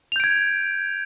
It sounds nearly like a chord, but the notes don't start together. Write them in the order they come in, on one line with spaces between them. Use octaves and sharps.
F7 G6 D7 G#6